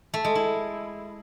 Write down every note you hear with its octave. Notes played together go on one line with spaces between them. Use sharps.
A3
G#3
E4